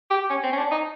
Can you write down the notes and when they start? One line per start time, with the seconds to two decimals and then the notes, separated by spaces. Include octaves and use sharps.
0.11 G4
0.30 C#4
0.43 C4
0.53 C#4
0.58 D4
0.71 D#4